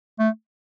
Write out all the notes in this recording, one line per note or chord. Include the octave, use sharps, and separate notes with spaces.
A3